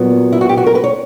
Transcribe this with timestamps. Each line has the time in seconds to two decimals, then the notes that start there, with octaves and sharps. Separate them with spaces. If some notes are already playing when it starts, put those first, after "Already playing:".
Already playing: A#2 F#3 B3
0.33 E4
0.41 F#4
0.49 G4
0.57 F#4
0.66 A#4
0.75 B4
0.84 C#5